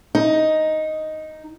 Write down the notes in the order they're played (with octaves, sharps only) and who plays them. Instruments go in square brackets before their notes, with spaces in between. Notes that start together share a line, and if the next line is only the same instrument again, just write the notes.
[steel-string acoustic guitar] D#4